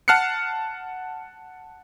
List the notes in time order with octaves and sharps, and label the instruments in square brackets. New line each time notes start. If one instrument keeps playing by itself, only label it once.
[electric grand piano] F#5 A5 F6 F#6 C7 C#7